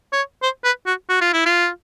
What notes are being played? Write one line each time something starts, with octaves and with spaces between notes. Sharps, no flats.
C#5
C5
B4
F#4
F#4
F4
E4
F4